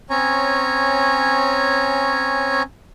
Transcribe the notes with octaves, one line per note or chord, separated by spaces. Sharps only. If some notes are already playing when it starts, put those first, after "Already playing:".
C4 C#4 C#5 G#5 A#5